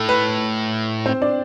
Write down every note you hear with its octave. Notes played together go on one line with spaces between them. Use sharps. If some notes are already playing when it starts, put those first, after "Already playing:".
Already playing: A2 A4
B4
C4 C5
D4 D5